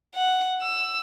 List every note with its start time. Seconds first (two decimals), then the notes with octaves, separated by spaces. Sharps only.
0.16 F#5
0.63 E6